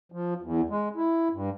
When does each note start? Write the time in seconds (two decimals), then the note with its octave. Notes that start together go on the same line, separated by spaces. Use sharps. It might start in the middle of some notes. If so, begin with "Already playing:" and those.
0.12 F3
0.42 E2
0.70 G#3
0.96 E4
1.33 G2